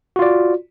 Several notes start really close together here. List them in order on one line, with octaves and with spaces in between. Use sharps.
F#4 F4 D5